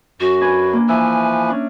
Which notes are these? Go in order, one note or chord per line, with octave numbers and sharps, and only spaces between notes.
F#2 F#4
D4 B4 G#5
A#3 D4
E3 F3 B4 E5 G#5
C#4 D4